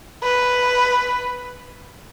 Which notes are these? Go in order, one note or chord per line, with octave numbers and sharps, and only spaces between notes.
B4